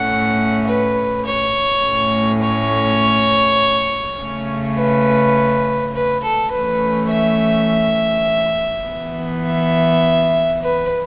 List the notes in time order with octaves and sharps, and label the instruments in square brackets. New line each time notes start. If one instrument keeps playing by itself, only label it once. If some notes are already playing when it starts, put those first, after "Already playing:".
Already playing: [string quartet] A2 A3 C#4 F#5
B4
C#5
A2 A3 C#4
C#5
C#3 A3 C#4
B4
B4
A4
E3 A3 C#4 B4
E5
E3 B3
E5
B4